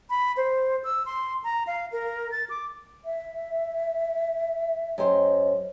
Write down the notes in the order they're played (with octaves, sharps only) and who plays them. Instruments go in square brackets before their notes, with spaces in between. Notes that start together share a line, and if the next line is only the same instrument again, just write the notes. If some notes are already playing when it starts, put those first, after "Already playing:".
[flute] B5
C5
E6
C6
A#5
F5
A#4
A6
D6
[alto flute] E5
[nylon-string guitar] F#2 G4 C5 [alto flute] D#5